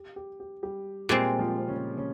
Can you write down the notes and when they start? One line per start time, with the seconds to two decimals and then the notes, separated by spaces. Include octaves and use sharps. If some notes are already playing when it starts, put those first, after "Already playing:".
Already playing: G4
0.16 G4
0.40 G4
0.63 G3 G4
1.09 A#2 G3 G#3 C4 G4
1.39 F3 F4
1.68 C#3 C#4
1.98 C#3 C#4